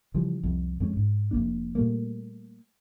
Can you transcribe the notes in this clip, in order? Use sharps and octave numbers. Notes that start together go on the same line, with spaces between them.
C#3 E3 F3 G3
C2 F2
F2 G#3 C#4
G#2
F1 F#2 A#3 D4
A#2 G3 A3 A#3